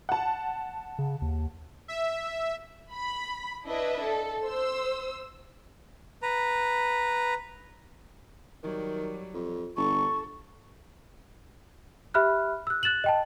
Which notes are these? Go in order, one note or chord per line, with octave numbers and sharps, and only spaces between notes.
F#5 A5
C#3
D#2
E5
B5
D4 E4 B4 D#5 E5
A4
C5 E6
B4 A#5
D#3 F#3 G3
F2
G1 A4 C#6
G4 E5 B5 F6 F#6
E6 F#6
F#6 A6 E7 F#7
D#5 G5 A5